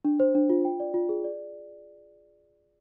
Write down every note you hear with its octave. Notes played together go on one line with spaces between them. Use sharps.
D4
C5
D4
F4
G5
D5
F4
G#4
D5